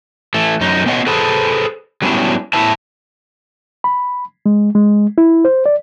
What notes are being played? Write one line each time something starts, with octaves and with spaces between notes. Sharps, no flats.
E3 A3
F#2 D#4
B3 C#4 F4 D#5 F#5
G#4 A4 B4 C5
F#3 G3 B3 C#4 D4 E4
E2 E3 E4 B4 E5 A5
B5
G#3
G#3
E4
C5
D5